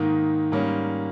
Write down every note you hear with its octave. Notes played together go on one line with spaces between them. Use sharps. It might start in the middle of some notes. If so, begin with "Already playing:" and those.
Already playing: G#2 D#3 A#3
G#2 G3 A#3 C#4